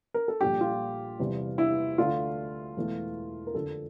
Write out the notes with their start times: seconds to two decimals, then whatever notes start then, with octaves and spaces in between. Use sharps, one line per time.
0.14 A#4
0.28 A4
0.41 A#1 A#2 G3 G4
0.61 F4
1.20 E2 C3 G3
1.58 E4
1.98 D2 D3 A3 F4
2.76 E1 E2 E3 A3
3.47 A#4
3.54 F2 D3 F3 A4